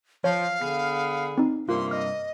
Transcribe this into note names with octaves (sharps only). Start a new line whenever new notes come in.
F3 C#5 F5
D3 B3 G#4 C7
C4 D#4
G2 C3 A#3 F4 C6
D#5 F6